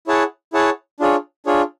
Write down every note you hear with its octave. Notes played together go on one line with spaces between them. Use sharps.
E4 G#4 C#5 F#5 A5
E4 G#4 C#5 F#5 A5
D4 F4 G#4 C#5
D4 F4 G#4 C#5